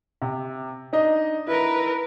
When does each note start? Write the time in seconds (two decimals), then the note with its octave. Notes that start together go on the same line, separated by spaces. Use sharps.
0.22 C3
0.93 D4 D#4 D#5
1.47 E4 A#4 B4